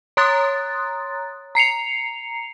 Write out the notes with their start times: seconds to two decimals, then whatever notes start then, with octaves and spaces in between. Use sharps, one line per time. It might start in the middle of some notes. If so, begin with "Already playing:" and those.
0.17 C#5 A#5 C6 D#6 F#6 A6
1.55 A#5 C7 C#7 F7